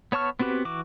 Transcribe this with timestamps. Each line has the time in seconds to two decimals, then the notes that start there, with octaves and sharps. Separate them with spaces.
0.12 B3 C#5 A5 C#6 F6
0.39 B3 C4 F#4 G4 B4
0.65 E3 F#4 D6